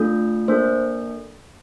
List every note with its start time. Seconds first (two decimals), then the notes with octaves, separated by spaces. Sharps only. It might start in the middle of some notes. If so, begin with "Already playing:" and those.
Already playing: A3 D4 F4 A4
0.48 A#3 D4 A4 C5